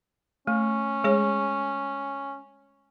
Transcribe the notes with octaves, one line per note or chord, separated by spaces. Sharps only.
A3 C#4
G#3 G#4 C#5